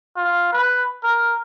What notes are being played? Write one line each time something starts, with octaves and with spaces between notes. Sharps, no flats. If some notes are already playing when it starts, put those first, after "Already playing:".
F4
B4
A#4